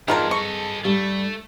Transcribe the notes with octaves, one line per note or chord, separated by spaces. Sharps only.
E2 G2 D#3 F4 G#4 A#4 A5
A4 D#5 C#6
G2 G3 A3